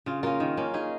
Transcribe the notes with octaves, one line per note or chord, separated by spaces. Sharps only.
C#3 F4
A#3 C#4 F4 A#4
D#3
A#3 C#4
D#4 G#4